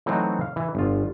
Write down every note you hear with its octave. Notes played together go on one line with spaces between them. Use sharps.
E3 F#3 A3 C4 D#4 F#4
F5
E3
G1 F4